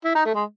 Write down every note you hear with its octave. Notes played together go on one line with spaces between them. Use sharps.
E4
D#4
A3
G#3